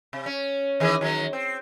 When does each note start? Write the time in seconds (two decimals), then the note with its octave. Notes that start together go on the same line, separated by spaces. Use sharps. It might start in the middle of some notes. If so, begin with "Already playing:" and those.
0.13 C3
0.26 C#4
0.80 D#3 E3 G#4
1.01 D#3 F#3
1.33 C4